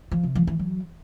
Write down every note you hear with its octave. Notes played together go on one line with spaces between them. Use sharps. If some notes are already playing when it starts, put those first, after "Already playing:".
F3
C3
F3
E3
F#3